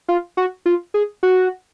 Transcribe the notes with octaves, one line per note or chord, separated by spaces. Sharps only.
F4
F#4
F4
G#4
F#4